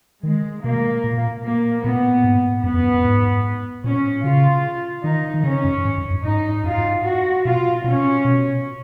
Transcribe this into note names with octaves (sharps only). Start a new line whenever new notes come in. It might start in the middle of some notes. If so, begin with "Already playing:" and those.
D#3 G#3
B2 A#3
A#2
A#3
A#2 B3
G#2
F#2 B3
F2
F#2
F#2
G#2
A#2 C#4
C#3 F4
D#3 D#4
D#3
C#3 C#4
F#2
G#2
F#2
F#2
G#2 D#4
F#2 F4
G#2
F#4
B2 F4
B2 C#4
B2